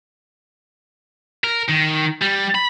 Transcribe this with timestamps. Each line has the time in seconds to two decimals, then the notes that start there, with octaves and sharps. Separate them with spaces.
1.44 A#4
1.69 D#3
2.22 G3
2.55 B5